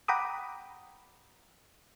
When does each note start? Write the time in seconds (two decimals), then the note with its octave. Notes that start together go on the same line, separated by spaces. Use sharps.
0.08 F#5 G5 A#5 B5 D6 D#6